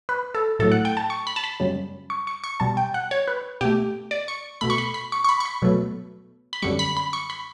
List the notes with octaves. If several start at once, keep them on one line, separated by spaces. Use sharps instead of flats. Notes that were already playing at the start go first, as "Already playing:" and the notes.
B4
A4
A2 F#3 A3 A4
F#5
G5
A5
C#6
B5
A5
B5
F#2 C#3 G3
C#6
C#6
C#6
B2 G3 A5
G5
F#5
C#5
B4
B2 A3 G4
D5
C#6
B2 A3 B5
C#6
B5
B5
C#6
C#6
B5
C#6
B5
B2 F#3 A3
B5
F#2 D3 G3 C#6
B5
B5
C#6
B5